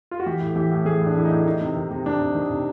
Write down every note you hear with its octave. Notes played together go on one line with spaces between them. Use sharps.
F4
F#4
E3 G4
A2
E3 G4
A2
E3 G#4
A2 D4
E3 E4
D#4
A2
D#3 D#4
C3
D#3
C3
D#3 D4
C3
D#3
C3